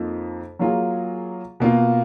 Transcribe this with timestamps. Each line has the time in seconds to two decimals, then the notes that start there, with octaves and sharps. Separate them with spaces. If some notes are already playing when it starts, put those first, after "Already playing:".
Already playing: F2 F3 A#3 D#4
0.59 F#3 A#3 F4 G#4
1.60 B2 A#3 F4